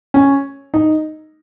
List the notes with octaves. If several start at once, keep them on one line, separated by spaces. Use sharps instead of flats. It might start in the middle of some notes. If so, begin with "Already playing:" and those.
C#4
D#4